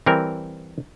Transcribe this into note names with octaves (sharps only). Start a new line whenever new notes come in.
E3 G3 C4 A#4